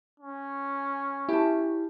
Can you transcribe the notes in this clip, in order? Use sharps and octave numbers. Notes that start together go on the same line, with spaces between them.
C#4
E4 G4 A5